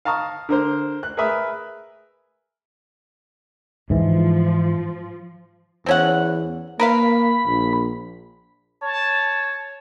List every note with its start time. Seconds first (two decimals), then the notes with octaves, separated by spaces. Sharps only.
0.05 F5 A5 A#5 C#6 D#6
0.49 D3 A#4 C5
1.03 F#6
1.17 G#4 A#4 B4 E5 D#6
3.90 G#2 E3 F3
5.86 E2 C4 C#4 F#5
6.80 A#3 A#4 B4 F5 B5
7.46 A#1
8.82 C#5 A5